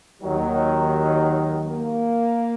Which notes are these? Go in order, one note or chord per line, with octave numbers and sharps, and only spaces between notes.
D#2 D#3 F#3
A#3